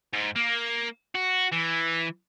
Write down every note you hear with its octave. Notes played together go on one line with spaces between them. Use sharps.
G#2
A#3
F#4
E3